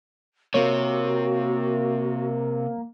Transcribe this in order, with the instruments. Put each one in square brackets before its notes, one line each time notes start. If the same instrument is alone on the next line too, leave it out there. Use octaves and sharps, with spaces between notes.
[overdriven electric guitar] C3 [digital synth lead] A#3 [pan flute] F#4 [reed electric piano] C#5